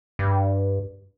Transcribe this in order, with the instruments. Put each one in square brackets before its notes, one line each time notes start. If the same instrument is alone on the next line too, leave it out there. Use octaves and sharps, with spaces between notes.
[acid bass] G2